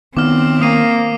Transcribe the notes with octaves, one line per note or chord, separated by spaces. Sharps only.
D#3 B3 C4 D6 F6
A#3 D#6 C7 D#7